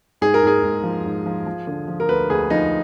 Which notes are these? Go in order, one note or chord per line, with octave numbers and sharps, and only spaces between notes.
G#2 G#4
A#4
G#2 G#4
G#2
F3
G#2
F3
F3
D3
F3
A#4
D2 B4
D2 G#4
F3 D#4